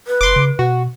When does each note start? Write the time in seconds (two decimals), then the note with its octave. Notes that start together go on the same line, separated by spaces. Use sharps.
0.07 B4
0.21 F#1 C6 D6
0.36 C#3
0.59 B2 F#4